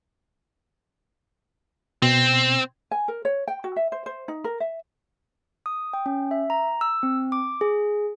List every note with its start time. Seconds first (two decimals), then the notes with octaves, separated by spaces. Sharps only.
2.02 B2 C4
2.91 G#5
3.08 A#4
3.25 C#5
3.48 G5
3.64 F#4
3.76 E5
3.92 C5
4.06 C5
4.28 D#4
4.44 A#4
4.60 E5
5.66 D#6
5.93 G5
6.06 C#4
6.31 E5
6.50 A#5
6.81 E6
7.03 C4
7.32 D6
7.61 G#4